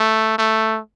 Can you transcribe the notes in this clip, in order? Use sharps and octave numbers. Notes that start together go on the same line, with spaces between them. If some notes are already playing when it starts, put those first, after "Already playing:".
Already playing: A3
A3